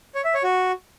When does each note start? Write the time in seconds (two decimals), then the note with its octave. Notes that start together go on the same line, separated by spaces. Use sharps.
0.15 C#5
0.24 E5
0.34 C#5
0.44 F#4